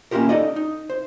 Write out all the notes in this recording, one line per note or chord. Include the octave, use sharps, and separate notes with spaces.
A#3 C#4 E4 F4 G4 A#4
D#4 A4 D5 D#5
D#4
C5